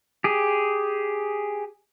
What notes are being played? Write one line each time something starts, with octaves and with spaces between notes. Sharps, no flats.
G4 G#4